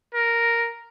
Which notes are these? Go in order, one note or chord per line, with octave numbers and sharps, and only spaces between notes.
A#4